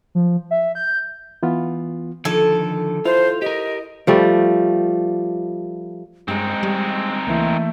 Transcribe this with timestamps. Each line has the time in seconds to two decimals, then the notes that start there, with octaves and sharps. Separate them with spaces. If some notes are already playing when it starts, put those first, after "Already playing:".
0.15 F3
0.51 E5
0.75 G6
1.43 E3 B3 F4
2.25 D3 D#3 F3 A4 G#6
3.05 E4 F4 C5
3.42 G4 A#4 D#5
4.07 F3 G3 A3
6.28 G2 G#3 C4 D#4
6.63 G3
7.27 C#2 E3 A3 A#3